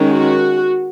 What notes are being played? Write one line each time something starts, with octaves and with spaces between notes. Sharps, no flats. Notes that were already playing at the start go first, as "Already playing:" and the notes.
Already playing: D#3 G#3 C#4
F#4